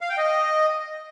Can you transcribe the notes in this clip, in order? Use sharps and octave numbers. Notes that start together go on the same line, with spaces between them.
F5
G5
D#5